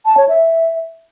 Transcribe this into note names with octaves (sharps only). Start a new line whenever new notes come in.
A5
C#5
E5